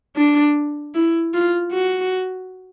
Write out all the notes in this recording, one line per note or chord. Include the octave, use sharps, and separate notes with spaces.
D4
E4
F4
F#4